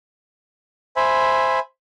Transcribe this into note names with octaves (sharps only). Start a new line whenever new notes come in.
C5 E5 G#5 B5